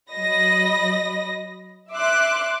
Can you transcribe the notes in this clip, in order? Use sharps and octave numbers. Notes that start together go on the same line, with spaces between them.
F#3 D#5 B5 A#6
E5 C6 D6 F#6